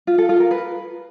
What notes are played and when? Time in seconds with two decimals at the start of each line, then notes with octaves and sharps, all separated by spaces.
0.07 F4
0.18 A4
0.29 F4
0.40 A#4
0.51 B4